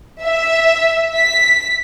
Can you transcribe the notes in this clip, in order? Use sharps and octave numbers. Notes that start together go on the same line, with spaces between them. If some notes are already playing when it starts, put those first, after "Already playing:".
E5
B6